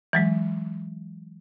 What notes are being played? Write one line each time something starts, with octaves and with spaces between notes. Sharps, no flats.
E3 F#3 G#3